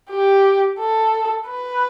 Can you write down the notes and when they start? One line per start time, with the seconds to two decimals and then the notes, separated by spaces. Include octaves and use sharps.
0.10 G4
0.79 A4
1.48 B4